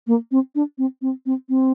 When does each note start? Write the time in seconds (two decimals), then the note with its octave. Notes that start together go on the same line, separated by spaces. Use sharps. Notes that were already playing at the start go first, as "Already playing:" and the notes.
0.07 A#3
0.31 C4
0.55 D4
0.78 C4
1.02 C4
1.26 C4
1.49 C4